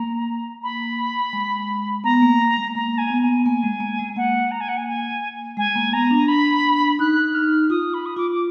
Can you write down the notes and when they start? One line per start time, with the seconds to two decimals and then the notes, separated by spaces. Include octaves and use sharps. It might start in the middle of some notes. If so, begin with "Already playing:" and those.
Already playing: A#3 A#5
0.63 B5
1.33 G#3
2.04 B3 A#5
2.22 A#3
2.39 A#3
2.57 G#3
2.75 A#3 A#5
2.98 G#5
3.10 B3
3.22 G#5
3.45 A#3 G#5
3.64 G#3
3.80 A#3
3.99 G#3
4.16 A#3 F#5
4.51 A#5
4.60 G#5
4.68 F#5
4.77 G#5
4.87 G#5
5.57 G#3 G#5
5.75 A#3
5.92 B3 A#5
6.11 D4
6.28 B5
6.99 D#4 F#6
7.34 F6
7.70 F4 D#6
7.94 B5
8.06 D#6
8.16 F4 D6
8.31 D6